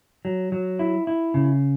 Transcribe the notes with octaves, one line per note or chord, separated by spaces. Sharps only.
F#3
F#3
E4
E4
C#3